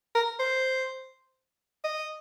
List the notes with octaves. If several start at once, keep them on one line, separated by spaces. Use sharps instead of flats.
A#4
C5
D#5